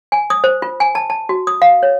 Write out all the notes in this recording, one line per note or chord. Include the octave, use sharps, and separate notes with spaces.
G#5
D#6
C5
F4
G#5
A5
A5
F#4
D#6
F5
C#5